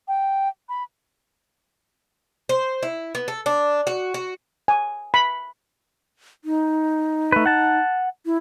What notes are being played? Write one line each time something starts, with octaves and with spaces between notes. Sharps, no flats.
G5
B5
C5
E4
B3
A4
D4
F#4
F#4
G#5
B5
D#4
A3 B4
F#5 A5
E4